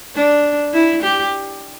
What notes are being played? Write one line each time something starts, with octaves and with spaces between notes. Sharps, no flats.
D4
E4
G4